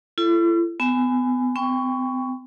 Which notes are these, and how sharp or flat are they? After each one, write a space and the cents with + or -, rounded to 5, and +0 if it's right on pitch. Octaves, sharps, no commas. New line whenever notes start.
E4 +45 A4 +0
B3 +30 G#5 +0
C4 -45 G5 +25 C#6 +10